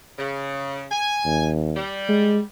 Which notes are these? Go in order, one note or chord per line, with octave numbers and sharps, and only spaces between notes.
C#3
G#5
D#2
G3
G#3